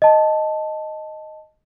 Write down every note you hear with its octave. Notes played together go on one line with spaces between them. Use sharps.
D#5 A5